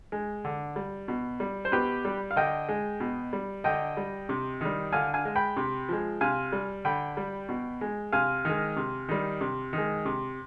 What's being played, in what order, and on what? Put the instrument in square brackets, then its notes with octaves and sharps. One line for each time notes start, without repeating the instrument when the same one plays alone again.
[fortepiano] G#3
D3
G3
B2
G3
C5
B2 G4 B4
G3
F5
D3 D#5 G5
G#3
B2
G3
D3 D#5 G5
G3
C3
D#3 G3
D3 F5 G#5
F5 G#5
G#3
G5 B5
C3
F3 G#3
C3 F5 G#5
G3
D3 G5 B5
G3
B2
G#3
C3 F5 G#5
D#3 G#3
C3
D#3 G3
C3
D#3
G#3
C3